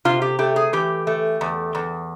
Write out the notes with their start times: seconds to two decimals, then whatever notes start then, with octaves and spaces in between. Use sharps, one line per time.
0.05 C3 F4
0.22 G4
0.39 A3 G4
0.56 G#4
0.73 E3 G4
1.07 A3
1.41 E2
1.75 E2